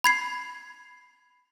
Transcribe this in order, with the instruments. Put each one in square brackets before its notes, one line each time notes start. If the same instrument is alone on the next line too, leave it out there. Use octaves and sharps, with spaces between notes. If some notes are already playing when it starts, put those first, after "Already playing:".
[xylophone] B5 G#6 C7